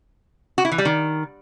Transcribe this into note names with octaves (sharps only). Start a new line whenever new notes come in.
F#4
E4
E3
G3
D#3